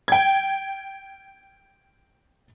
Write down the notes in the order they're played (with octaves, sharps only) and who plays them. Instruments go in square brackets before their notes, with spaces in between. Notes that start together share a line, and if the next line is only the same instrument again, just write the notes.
[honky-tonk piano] G5 G#6